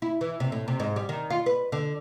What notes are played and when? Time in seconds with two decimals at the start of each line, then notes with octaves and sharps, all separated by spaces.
0.02 E4
0.21 E3
0.40 C3
0.52 A2
0.68 C3
0.80 G#2
0.96 G3
1.09 D#3
1.30 F4
1.46 B4
1.72 D3